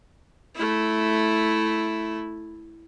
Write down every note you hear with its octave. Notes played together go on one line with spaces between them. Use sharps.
A3 E4